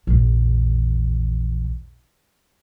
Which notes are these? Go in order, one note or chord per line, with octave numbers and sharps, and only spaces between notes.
A#1 E2